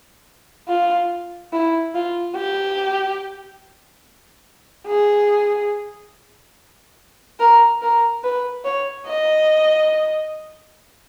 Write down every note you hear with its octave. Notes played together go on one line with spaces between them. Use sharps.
F4
E4
F4
G4
G#4
A#4
A#4
B4
C#5
D#5